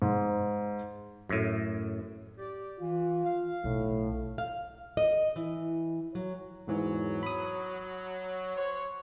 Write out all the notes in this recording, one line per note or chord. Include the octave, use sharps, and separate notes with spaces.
G#2
F#2 A2
G4 D5
E3 F4
F5
B1 A2
F5
D#5
E3
F#3
E2 G#2 E3 F#3
B5 D#6
F#4 C5 C#5